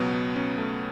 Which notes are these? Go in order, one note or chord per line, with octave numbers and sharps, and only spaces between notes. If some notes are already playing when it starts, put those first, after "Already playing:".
Already playing: C#2 B2 F#3 B3
B3
C#4
A3